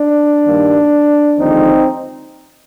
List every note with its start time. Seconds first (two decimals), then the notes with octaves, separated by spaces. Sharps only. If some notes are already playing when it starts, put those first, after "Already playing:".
Already playing: D4
0.46 G2 D#3 G3 A#3
1.38 D#2 D3 F3 G#3 C4 D#4